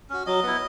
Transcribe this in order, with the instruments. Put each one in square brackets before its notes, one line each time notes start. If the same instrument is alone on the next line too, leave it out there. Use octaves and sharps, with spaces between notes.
[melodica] C#4 F#4
F#3 D#5
B3 E4